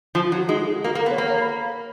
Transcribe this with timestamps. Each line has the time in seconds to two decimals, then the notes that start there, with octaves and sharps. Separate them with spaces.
0.15 F3 F4
0.26 F4
0.32 F#3
0.38 F#4
0.49 G#3 D#4
0.58 F4
0.67 G#4
0.75 F#4
0.84 A#3
0.95 A#3
1.01 A#4
1.06 B3
1.11 C#5
1.18 A#3 B4
1.30 C#5
1.41 B5